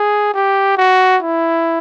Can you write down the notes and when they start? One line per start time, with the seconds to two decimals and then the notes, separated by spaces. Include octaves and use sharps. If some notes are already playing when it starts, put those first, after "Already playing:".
Already playing: G#4
0.34 G4
0.78 F#4
1.23 E4